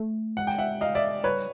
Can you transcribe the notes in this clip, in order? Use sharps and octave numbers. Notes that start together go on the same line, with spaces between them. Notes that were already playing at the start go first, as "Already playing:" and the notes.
Already playing: A3
G#3 F#5
G5
E5 F#5
D#5 F5
D5 E5
G3 B4 C#5